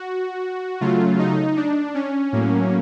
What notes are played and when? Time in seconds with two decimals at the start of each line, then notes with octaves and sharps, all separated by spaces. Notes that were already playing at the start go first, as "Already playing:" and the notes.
Already playing: F#4
0.81 C#3 F#3 A3 F4
1.19 D#4
1.56 D4
1.95 C#4
2.33 A2 F#3 A#3